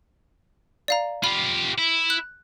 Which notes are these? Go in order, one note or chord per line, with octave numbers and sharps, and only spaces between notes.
D5 F5 A#5
F4 G4 B5
E4
F#6